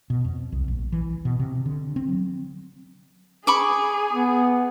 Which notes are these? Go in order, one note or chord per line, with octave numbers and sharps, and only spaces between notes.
B2
F2
C2
A#1
E3
B2
C3
D3
C4
F#3
G#4 B5 C#6 D6
B3